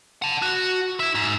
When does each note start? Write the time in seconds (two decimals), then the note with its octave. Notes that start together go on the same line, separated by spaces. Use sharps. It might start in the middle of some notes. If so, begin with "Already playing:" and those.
0.22 F#5 A5
0.42 F#4
1.00 E4 E5
1.15 G#2